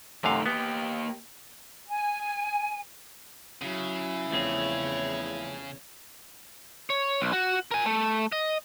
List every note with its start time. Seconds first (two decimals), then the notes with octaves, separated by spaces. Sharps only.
0.24 F#2 C3 D#3 A3 F5
0.46 A#3 B3 G4
1.88 G#5
3.62 C#3 F#3 E4
4.31 E2 F3 A3 C4 C#5
6.90 C#5
7.20 B1
7.33 F#4
7.71 A#4 G#5
7.86 A3
8.32 D#5